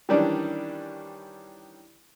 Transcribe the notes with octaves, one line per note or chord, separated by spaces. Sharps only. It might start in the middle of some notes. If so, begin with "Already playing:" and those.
D#3 E3 G3 C#4 D4